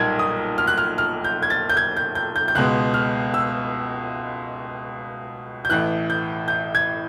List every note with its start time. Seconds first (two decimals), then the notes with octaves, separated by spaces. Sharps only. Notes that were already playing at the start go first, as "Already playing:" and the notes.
Already playing: B1 A#2 G3 A#3 D#4 G#6
0.19 D#6
0.58 F6
0.67 F#6
0.78 F6
0.98 F6
1.24 G6
1.42 G#6
1.50 A6
1.69 G6
1.77 G#6
1.97 G6
2.15 G6
2.36 G6
2.48 G6
2.55 C#2 B2 G#3 F#6
2.94 F6
3.34 E6
5.65 G6
5.69 A1 A2 E3 F#6
6.10 G6
6.48 G6
6.75 G#6